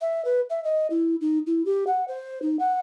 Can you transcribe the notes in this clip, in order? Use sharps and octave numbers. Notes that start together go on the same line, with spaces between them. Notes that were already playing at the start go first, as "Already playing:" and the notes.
E5
B4
E5
D#5
E4
D#4
E4
G4
F#5
C5
D#4
F#5